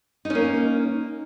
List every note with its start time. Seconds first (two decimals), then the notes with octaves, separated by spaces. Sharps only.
0.25 D#4
0.30 C#4
0.35 A#3